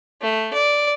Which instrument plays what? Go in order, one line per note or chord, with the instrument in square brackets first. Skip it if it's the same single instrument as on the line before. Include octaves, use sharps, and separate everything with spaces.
[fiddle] A3
D5